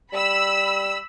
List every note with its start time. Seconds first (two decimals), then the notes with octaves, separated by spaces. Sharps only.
0.12 G3 B5 E6